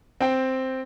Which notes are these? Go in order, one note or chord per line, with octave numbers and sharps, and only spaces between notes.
C4 G5